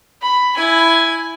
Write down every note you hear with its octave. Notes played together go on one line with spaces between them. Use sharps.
B5
E4 G#5